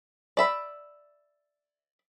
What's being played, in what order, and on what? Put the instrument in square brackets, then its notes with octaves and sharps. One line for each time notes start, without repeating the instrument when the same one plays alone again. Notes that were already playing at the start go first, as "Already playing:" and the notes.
[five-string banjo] D5 E5 B5